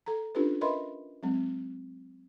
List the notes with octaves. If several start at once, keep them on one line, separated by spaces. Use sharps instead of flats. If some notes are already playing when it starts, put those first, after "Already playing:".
A4 A#5
C#4 D4 F4 G4 A4 B4
A#4 B4 D#5 E5 B5 C6
F#3 G#3 C4